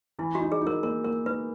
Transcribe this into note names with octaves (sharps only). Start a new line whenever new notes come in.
E3 E4
F#4
D#4
G#4
D#4
A#4
A#3 A#4
A#3 A#4
D#4 B4